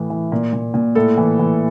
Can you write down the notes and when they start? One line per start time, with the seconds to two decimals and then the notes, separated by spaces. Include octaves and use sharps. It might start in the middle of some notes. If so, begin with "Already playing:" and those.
Already playing: A2 E3
0.10 E3
0.32 A#2
0.53 A#2
0.74 A#2
0.95 A2 A4
1.18 E3
1.39 E3